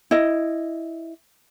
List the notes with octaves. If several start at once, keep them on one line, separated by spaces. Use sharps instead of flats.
E4 D#5